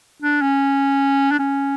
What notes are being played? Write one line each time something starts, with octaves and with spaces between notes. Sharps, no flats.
D4
C#4
D4
C#4